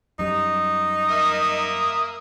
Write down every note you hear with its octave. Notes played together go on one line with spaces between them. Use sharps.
F#2 G3 D#4
A#3 E5 D#6